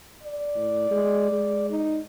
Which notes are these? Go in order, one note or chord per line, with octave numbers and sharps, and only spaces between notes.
D5
A2
G#3
G#3
D#4